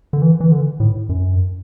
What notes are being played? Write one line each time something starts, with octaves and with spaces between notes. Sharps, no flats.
D3
E3
E3
D3
A2
F#2